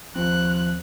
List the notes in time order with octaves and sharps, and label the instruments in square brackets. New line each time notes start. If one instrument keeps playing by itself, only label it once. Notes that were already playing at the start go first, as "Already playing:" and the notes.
[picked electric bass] D#2 C4 [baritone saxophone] F3 [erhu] F#6